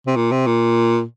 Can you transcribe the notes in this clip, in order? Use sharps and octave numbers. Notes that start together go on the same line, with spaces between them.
C3
A#2
C3
A#2